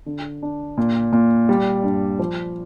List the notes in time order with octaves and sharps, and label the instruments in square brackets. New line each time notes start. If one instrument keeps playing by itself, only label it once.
[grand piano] D3
D4
A#2
A#2
G3
G2
F3